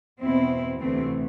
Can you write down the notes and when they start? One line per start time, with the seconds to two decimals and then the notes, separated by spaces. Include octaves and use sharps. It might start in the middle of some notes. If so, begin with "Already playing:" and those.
0.21 E2 B2 C4 E4
0.80 D2 C3 E3 A3 C4